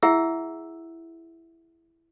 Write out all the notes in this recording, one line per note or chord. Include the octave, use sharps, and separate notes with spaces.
E4 G#4 E5 F#5 E6